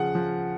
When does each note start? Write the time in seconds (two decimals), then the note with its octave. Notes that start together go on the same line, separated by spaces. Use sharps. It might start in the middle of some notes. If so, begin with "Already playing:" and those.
Already playing: C#3 F3 F#5
0.15 F3